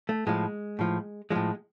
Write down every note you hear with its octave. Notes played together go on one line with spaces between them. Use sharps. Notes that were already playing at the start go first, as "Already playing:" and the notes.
A3
A2 F3 G#3
A2 F3
A2 F3 G#3